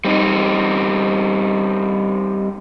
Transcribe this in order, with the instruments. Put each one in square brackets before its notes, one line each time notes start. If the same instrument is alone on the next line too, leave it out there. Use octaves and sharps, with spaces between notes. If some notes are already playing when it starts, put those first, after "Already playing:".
[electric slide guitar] G3 C4 D#4